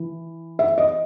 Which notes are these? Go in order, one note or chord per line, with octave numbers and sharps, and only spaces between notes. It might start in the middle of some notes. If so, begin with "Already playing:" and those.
Already playing: E3
E5
D#5